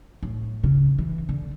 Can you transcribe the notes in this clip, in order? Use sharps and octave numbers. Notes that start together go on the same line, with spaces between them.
A2
C#3
E3
D3